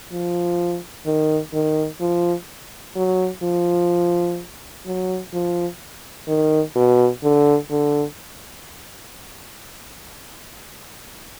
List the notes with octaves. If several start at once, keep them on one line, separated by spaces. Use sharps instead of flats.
F3
D#3
D#3
F3
F#3
F3
F#3
F3
D#3
B2
D3
D3